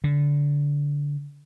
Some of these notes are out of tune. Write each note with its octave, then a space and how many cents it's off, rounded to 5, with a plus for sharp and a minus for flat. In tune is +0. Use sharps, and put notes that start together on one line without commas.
D3 -20